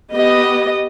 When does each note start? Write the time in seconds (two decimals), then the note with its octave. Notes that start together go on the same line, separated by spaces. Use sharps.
0.13 B3 G4 D#5